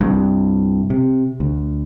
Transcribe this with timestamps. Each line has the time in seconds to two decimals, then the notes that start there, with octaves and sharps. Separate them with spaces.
0.01 C2 G2
0.90 C3
1.40 D2